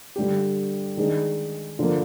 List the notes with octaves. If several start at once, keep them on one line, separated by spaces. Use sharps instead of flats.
D3 G3 D4 G4
D#3 G#3 D4 G#4
D3 F3 A#3